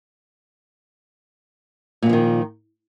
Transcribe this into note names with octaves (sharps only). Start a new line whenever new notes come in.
A#2 D#3 F3 F#3